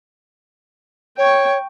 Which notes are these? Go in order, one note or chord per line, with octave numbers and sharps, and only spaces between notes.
C#5 G5 C#6